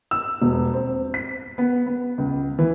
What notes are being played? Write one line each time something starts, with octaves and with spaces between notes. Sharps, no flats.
E6
E1
C4
B6
B3
B3
C#2
E3